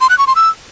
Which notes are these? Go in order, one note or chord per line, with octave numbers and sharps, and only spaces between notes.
C6
F#6
C#6
C6
E6